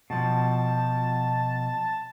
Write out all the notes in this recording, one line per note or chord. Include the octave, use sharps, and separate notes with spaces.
B2 F3 A5